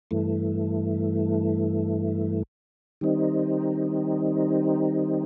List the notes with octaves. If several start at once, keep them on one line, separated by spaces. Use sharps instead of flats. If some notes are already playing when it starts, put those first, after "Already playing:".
G2 E3 A3
D#3 G3 C4 D#4